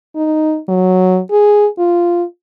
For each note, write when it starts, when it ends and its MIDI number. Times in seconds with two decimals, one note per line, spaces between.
0.16 0.59 63
0.69 1.20 54
1.31 1.67 68
1.78 2.24 65